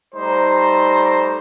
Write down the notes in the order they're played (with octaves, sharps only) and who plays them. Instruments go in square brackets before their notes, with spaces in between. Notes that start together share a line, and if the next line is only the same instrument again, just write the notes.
[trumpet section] G3 A3 D#4 C5 A#5